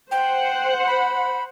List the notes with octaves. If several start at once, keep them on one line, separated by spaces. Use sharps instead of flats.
C5 F#5 G5
B5